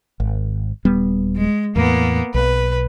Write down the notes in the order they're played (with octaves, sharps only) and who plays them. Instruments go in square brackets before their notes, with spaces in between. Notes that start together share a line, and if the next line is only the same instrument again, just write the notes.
[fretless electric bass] G#1
D#1 G3 B3
[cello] G#3
[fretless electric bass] E2 A2 [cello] A#3 B3
[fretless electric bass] B1 [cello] B4